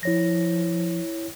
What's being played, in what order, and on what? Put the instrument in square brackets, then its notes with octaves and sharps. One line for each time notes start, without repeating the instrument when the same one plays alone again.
[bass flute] F3 [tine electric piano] E4 C#5 A#6